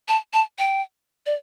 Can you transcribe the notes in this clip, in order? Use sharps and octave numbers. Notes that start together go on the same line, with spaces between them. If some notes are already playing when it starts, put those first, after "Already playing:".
A5
A5
G5
D5